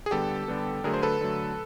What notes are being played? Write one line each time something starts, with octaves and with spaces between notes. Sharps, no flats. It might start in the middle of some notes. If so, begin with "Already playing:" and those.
G#4
D3 G3 B3 G4 A4
D3 G3 B3
D3 F#3 A3 G#4 A#4
C5
A4 B4
D3 F#3 A3